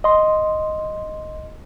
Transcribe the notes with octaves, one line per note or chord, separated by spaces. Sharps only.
D#5 C6